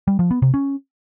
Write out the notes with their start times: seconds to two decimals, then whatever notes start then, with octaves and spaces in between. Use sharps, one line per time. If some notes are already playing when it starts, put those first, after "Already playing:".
0.08 G3
0.19 F3
0.31 B3
0.42 C3
0.54 C#4